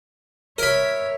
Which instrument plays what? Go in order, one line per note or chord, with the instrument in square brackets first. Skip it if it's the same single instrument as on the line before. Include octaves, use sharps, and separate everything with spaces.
[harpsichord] A#4 B5 [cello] C#5 E5